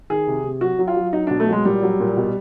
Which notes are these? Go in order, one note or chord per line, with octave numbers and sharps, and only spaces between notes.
D#3 G#4
C3
C3
F#3 F#4
F#3
F4
F#3
F#3 D#4
B2 D4
A3
F#3 G#3
A#2 G3
F#3
A#2
B2